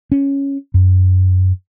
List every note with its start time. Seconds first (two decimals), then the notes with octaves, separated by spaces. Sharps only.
0.12 C#4
0.74 F#2